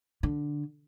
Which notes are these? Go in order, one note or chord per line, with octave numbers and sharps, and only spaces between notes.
D3